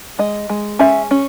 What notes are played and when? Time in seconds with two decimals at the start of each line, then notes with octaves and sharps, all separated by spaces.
0.19 G#3 D#5
0.49 G#3
0.79 C#4 E5
1.11 C#4